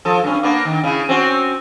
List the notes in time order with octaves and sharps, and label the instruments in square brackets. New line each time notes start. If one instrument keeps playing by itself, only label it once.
[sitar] F3 A4
G2 C#4
A#3 B3 D4
D#3
C#3 E4
C4 C#4 F#4